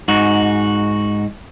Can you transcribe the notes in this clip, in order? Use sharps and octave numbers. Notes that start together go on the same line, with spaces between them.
G#2 D#4 F#4